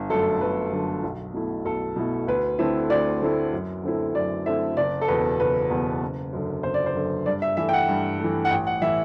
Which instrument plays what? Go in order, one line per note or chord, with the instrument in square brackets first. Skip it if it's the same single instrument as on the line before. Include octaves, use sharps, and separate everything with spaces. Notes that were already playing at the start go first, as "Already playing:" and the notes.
Already playing: [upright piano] G1
F#2 D3 A3 A4
G1 B4
F#2 D3 A3
B1
B2 A3 E4
B1 A4
B2 A3 E4
D2 B4
D3 A3 C4 E4
D2 D5
D3 A3 C4 E4
F#2
D3 A3 C4 E4
F#2 D5
D3 A3 C4 E4 E5
F#1 D5
A4
E2 B2 B4
F#1 B4
E2 B2
F#1
F#2 D3
F#1 C5
D5
C5
F#2 D3
G2 D5
E5
E3 A3 E5
G5
F#5
G2
E3 A3
F#5
A1 G5
F#5
A2 E3 E5